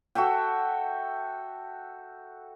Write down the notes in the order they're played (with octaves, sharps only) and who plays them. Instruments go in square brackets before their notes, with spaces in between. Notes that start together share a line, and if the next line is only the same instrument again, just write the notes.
[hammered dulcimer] F#4 A4 E5 G5